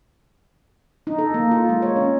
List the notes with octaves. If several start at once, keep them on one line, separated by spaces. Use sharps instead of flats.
D#4
A4
A#3
F4
G#3
C#5
C#4